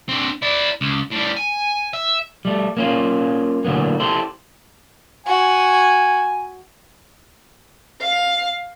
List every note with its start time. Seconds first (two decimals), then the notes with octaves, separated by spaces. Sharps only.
0.09 C4 D4
0.42 E4 D5
0.81 C#2
1.12 A2 G3
1.37 G#5
1.93 E5
2.45 G3 A3
2.77 A#3 C#4 F4
3.65 A2 D3 F#3 A#3 B3
4.00 E4 G4 A4 C5
5.26 F#4 G#5
8.01 F5